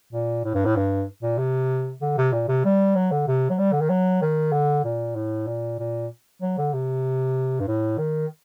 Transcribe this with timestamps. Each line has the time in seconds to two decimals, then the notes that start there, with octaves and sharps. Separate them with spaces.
0.13 A#2
0.45 A2
0.54 G2
0.65 A2
0.76 G2
1.23 A#2
1.38 C3
2.01 D3
2.17 C3
2.32 A#2
2.48 C3
2.65 G3
2.95 F#3
3.12 D3
3.28 C3
3.50 F#3
3.58 G3
3.72 D3
3.81 D#3
3.89 F#3
4.22 D#3
4.52 D3
4.84 A#2
5.16 A2
5.47 A#2
5.79 A#2
6.42 F#3
6.58 D3
6.73 C3
7.60 G2
7.67 A2
7.98 D#3